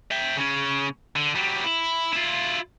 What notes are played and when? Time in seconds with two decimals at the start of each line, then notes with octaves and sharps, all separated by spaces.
0.11 E5 G5
0.37 C#3 C#4
1.16 D3
1.35 F#3 G3
1.64 E4
2.13 E4 F4